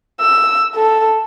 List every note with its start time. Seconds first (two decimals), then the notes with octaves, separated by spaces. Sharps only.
0.21 E6
0.76 A4